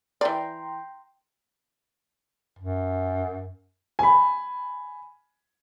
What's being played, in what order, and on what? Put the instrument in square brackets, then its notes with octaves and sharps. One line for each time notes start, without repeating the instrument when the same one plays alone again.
[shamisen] E3 D5 [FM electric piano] G5 A#5 C6
[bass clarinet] F#2
[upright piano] G#5 B5